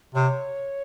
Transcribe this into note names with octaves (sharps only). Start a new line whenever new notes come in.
C3 C#5